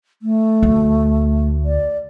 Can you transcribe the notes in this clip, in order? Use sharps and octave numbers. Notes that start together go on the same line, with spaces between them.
A3
D2
D5